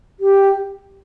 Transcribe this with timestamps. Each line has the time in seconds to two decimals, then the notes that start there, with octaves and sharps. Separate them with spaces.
0.20 G4